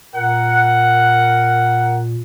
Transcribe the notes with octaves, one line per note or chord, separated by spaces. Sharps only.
A#2 A#4 F#5